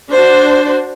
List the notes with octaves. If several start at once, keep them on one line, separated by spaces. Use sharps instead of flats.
D4 F#4 C5